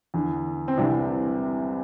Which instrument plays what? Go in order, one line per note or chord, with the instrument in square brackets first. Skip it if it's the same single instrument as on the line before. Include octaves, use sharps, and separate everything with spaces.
[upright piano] E2 D3
C4
C2 C3 E3 D4